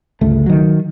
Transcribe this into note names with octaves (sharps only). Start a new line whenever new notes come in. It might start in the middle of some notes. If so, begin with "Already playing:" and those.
G1 C#2 A3
D#3 F#3